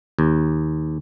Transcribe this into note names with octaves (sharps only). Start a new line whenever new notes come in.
D#2